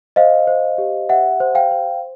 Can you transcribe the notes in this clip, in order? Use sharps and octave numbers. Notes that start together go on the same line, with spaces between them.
C5 D#5 F5
C5
G4
G4 E5 F#5
C5
F5 G5
C5